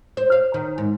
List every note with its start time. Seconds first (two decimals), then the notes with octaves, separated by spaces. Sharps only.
0.17 C5
0.32 F5
0.54 D#3
0.78 G#2